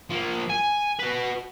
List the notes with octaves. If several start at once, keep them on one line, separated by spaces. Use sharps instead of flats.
F3 A#3
G#5
F#4 B4